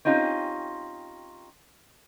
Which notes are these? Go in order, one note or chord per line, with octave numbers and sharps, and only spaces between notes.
C4 C#4 D#4 F4 G4